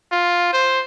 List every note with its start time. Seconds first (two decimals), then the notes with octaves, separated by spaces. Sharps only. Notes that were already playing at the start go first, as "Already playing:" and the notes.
0.12 F4
0.53 C5